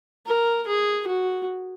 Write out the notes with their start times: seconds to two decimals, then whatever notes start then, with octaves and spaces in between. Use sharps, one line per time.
0.26 A#4
0.67 G#4
1.07 F#4